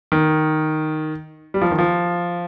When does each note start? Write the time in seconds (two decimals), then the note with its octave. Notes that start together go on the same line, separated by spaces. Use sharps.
0.12 D#3
1.54 G3
1.61 F3
1.71 D#3
1.78 F3